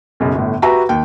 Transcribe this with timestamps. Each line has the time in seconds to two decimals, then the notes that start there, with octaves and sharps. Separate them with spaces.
0.20 B1 F#2 C#3
0.35 G1 A2
0.62 F#4 G4 B4 E5 A#5
0.89 D#2 G5